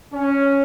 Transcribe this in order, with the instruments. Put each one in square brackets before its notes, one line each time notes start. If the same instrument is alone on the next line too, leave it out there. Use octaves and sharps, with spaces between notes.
[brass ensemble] C#4